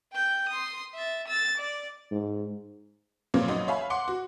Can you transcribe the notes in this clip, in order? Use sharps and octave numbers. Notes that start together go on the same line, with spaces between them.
G5 G6
C6 D#6
E5 A6
E6 A6
D5
G#2
F#2 A#2 C#3 F3 A#3 C4
A1 F#2 D#4 D#6
C#5 E5 F5 G#5 B5
F#5 C6 D6 C#7
F#4